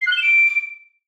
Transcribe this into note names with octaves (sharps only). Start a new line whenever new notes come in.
C7
F#6
G7
E7
D7